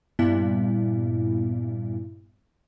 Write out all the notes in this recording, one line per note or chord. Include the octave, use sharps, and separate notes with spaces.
G2 A#2 G3 B3 E4